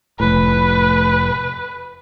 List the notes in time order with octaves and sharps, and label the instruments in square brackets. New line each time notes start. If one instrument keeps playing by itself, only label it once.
[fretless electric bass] F1 A2 [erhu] B4